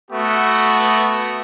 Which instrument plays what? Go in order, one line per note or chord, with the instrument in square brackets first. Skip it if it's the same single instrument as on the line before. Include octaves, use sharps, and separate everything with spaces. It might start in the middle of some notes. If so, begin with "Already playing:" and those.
[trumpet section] A3 B3 F#4